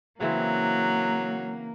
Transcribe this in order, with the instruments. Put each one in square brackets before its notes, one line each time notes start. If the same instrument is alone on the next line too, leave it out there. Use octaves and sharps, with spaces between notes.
[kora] C#3 E3 C4 [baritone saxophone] F#3 [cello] A#3